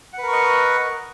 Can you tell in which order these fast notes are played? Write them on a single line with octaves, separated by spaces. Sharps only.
F#5 B4 A#4 C#6 D#5